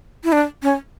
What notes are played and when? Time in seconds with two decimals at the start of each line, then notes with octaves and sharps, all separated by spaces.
0.24 E4
0.32 D4
0.63 C#4